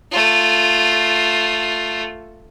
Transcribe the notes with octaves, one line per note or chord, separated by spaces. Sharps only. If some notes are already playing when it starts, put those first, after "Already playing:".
A3 F4